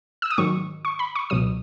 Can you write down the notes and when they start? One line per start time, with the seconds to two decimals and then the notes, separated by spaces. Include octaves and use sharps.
0.22 E6
0.30 D#6
0.38 G#2 D#3 F#3 C#6
0.85 C#6
0.99 B5
1.15 C#6
1.30 C#2 B2 F#3 D#6